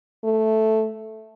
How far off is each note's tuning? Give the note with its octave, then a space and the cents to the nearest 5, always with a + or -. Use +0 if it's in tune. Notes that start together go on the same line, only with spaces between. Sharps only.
A3 -5